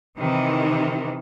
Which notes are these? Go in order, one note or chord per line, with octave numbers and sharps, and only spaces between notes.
C3 D#3 E3